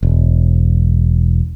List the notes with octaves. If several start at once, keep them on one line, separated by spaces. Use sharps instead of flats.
E1